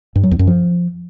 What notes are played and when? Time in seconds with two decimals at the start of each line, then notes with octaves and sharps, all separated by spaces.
0.16 G2
0.23 F#3
0.31 E2
0.39 F#2
0.47 F3